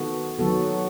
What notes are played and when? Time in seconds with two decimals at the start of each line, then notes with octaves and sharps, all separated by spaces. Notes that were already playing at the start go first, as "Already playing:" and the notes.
Already playing: D#3 B3 F#4 A4
0.39 D#3 F#3 B3 F#4 A4